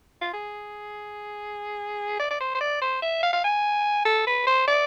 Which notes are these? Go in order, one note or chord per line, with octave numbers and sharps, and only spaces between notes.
F4
G#4
D5
D5
C5
C5
D5
C5
E5
F5
F5
G#5
A4
B4
C5
D5